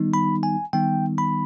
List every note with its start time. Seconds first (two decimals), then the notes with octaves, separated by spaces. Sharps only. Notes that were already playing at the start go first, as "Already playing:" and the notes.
Already playing: D#3 G3 B3 D#4
0.14 B5
0.43 G#5
0.73 D#3 G3 B3 D#4 G5
1.18 B5